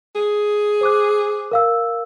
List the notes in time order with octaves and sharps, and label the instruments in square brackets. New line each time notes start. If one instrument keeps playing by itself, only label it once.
[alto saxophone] G#4
[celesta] C5 D6 F#6
A#4 F5 E6